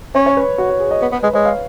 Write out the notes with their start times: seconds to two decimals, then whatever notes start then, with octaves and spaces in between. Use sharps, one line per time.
0.15 C#4 C#5
0.26 C#5
0.37 B4
0.58 F#4
0.70 F#4
0.80 G#4
0.91 D#5
1.01 B3 B4
1.12 B3 B4
1.23 G#3 B4
1.33 G#3 C#5
1.45 F5